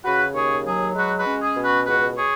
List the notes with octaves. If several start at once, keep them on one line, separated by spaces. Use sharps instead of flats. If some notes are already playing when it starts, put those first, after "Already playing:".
C#3 F#4 B4
D#2 G#4 C#5
F#3 G#4
G#3 F#4 B4
F#4 B4
C#4
G#4
B2
F#4 B4
C#2 F#4 B4
G#4 C#5